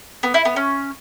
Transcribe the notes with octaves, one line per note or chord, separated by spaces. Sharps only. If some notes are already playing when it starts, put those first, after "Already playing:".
B3
E4
B3
C#4